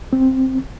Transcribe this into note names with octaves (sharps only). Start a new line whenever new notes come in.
C4